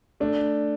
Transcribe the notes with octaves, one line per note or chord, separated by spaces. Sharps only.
A3 D4